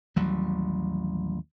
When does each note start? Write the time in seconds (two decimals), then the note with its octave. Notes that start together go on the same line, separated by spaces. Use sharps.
0.16 A1 D#2 F#3 G3